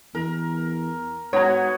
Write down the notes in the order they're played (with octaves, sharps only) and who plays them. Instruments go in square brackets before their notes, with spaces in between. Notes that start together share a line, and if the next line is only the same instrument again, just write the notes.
[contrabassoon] E2 [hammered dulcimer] A#4
[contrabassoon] G#2 [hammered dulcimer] B3 F#4 [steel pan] C#5 A#5 [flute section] F#5 G#6